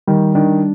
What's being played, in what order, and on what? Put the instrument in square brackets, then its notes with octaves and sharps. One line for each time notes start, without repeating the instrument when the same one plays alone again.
[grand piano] D#3 [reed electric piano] G3
[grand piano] D#3 [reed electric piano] D4